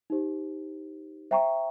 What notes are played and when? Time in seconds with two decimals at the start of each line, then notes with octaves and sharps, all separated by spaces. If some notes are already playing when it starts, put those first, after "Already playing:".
0.10 D#4 G4 C5
1.31 C5 E5 G5 A#5 C#6